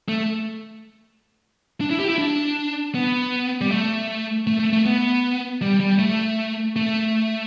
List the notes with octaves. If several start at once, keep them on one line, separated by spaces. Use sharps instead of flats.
A3
D4
E4
G4
E4
D4
B3
G3
A3
A3
A3
A3
B3
G3
G3
A3
A3